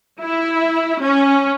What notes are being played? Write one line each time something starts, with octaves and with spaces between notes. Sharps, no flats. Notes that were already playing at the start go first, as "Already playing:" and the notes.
E4
C#4